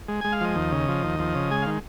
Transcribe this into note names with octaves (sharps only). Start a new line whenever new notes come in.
G#3
G#3 G#5
F5
F3 D#5
D#2
C#3
F3
D#2
F3
C#3
G#3 G#5
F5
D#3